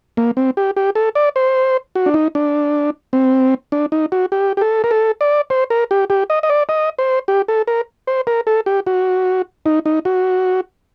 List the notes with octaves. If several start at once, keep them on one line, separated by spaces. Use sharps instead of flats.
A#3
C4
G4
G4
A4
D5
C5
F#4
D4
D#4
D4
C4
D4
D#4
F#4
G4
G4
A4
A#4
A4
D5
C5
A#4
G4
G4
D#5
D#5
D5
D#5
C5
G4
A4
A#4
C5
A#4
A4
G4
F#4
D#4
D#4
F#4